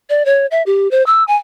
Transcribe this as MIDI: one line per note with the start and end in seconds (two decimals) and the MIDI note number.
0.10 0.25 74
0.25 0.46 73
0.51 0.63 76
0.66 0.90 67
0.91 1.04 72
1.06 1.24 88
1.28 1.36 80